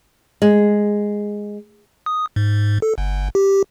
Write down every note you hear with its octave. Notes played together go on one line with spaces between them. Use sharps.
G#3
D#6
G#2
A4
G1
G4